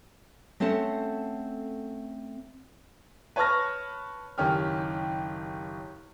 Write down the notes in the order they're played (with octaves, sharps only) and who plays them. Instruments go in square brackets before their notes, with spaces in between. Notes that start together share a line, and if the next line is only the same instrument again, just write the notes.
[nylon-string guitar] A3 C4 C#4 A4 F#5 A5
[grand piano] B4 C#5 A5 C#6 F6 A#6
F#1 D#3 C#4 G4 F6